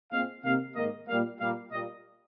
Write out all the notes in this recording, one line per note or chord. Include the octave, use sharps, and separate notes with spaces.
A#2 G#3 C4 F5
C3 D#3 A#3 F5
G#2 D#3 A#3 D#5
A#2 G3 A#3 F5
A#2 G3 A#3 F5
A#2 G3 A#3 D#5